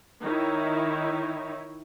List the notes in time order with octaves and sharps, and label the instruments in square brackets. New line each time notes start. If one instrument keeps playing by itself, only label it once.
[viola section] D#3 D#4 E4 C#5